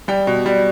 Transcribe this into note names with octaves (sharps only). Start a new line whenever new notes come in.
G3 G5
B2
G3